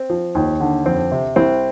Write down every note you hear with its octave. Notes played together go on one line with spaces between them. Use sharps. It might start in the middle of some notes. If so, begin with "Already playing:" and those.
Already playing: C4
F3
D#2
D3
F2 C4
C3
C2 C4